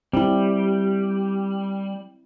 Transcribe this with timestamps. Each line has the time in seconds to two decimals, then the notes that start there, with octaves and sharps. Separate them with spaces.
0.13 G3 C4 E4